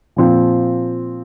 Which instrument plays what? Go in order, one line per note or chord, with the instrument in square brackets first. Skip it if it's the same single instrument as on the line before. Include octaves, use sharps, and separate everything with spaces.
[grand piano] A#2 F3 C4 F4